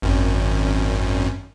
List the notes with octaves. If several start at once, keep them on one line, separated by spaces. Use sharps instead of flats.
G#1 F#2